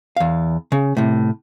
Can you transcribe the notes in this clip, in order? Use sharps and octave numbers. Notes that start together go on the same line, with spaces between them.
E2 F5
C#3
A2 C3